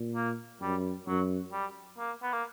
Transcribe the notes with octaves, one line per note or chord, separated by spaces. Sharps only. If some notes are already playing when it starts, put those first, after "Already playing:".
Already playing: A#2
A#3
F#2 G3
F#2 F#3
G3
A#3
B3
A#3